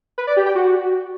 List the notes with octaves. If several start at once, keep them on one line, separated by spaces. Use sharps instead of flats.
B4
D5
G4
G5
F#4